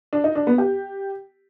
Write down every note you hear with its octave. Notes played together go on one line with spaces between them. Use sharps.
D4
D#4
D4
B3
G4